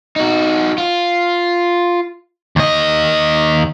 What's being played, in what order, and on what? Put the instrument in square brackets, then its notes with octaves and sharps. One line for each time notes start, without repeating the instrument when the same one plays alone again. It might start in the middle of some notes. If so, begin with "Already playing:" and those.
[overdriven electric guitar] D#4 F#4
F4
D#2 D#5